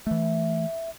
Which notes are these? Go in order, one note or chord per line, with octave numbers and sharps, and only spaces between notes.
E3 A3 E5